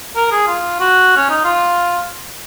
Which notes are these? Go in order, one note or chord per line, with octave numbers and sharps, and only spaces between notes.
A#4
G#4
F4
F#4
C#4
D#4
F4